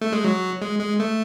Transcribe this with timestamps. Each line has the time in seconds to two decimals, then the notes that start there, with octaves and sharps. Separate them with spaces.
0.01 A3
0.13 G#3
0.24 F#3
0.62 G#3
0.80 G#3
1.00 A3